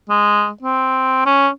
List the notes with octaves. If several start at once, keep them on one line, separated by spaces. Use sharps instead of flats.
G#3
C4
C#4